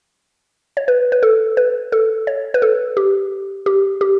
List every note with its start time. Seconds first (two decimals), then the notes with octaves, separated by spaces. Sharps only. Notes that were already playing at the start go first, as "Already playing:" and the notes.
0.77 C#5
0.88 B4
1.12 B4
1.23 A4
1.57 B4
1.92 A4
2.27 C#5
2.54 B4
2.62 A4
2.97 G4
3.66 G4
4.01 G4